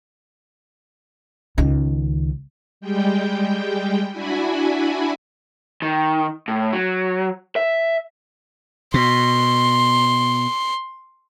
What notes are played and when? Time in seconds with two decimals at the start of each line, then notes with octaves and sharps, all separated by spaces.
1.58 C#2 D#3
2.81 G3 G#3 G5
4.12 D4 E4 F#4 G#5 B5
5.82 D#3
6.48 A2
6.73 F#3
7.56 E5
8.94 B2 C6